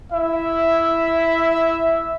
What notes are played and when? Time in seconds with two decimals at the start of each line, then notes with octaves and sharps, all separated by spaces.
0.11 E4 E5